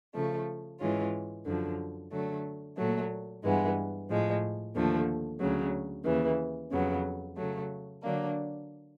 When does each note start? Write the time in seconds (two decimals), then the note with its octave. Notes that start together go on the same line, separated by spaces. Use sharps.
0.15 C#3 F3 A3
0.80 G#2 E3 G#3 C#4 F4
1.46 F#2 D3 F3
2.11 D3 F#3 A3
2.77 A#2 F#3 A3
3.44 G2 E3 G#3 B3
4.09 A2 F3 G#3
4.75 D#2 D3 F3 A3
5.40 D2 C#3 F#3
6.05 D#2 C#3 E3
6.72 F2 C#3 F#3 B3
7.37 C#3 F#3 A3
8.03 D3 F#3 A#3 D4